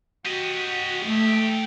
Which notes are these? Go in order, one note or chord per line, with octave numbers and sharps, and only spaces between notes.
F#4 G4 D#5
A3